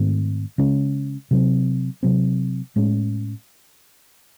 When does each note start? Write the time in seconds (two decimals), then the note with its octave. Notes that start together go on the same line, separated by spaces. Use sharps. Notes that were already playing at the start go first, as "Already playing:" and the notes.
Already playing: G#2 D#3 A3 C4
0.58 C#3 G#3 C#4
1.31 C3 F#3 C4
2.03 C3 F#3 C4
2.76 A2 G#3 C#4